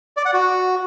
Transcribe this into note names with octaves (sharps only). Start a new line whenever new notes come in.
D5
F#5
F#4